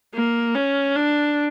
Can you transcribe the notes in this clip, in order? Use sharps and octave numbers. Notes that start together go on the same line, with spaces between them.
A#3
C#4
D4